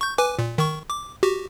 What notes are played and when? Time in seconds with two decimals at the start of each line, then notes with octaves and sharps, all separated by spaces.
0.01 C#6 G6
0.18 B4 G#5 D6
0.39 A#2
0.58 D#3 C#6
0.90 D6
1.23 F#4 G4